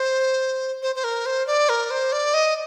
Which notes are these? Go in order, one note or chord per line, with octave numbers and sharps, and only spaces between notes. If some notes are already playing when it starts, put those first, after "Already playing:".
Already playing: C5
C5
C5
A#4
C5
D5
A#4
C5
D5
D#5